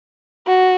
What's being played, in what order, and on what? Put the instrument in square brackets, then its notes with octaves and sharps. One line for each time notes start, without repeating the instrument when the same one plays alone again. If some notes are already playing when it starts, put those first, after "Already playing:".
[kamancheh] F#4